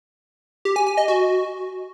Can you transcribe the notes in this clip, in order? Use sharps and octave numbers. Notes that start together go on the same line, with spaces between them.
G4
G#5
G#5
D#5
F#4